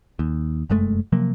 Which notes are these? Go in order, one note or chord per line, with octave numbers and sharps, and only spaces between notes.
D#2
F1 F#2 G#3 A3
C3 F3 F#3 A#3